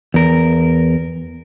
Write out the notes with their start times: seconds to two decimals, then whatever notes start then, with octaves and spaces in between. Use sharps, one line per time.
0.14 E2 A#4